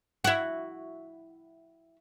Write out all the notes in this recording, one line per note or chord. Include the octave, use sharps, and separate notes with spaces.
E4 F#4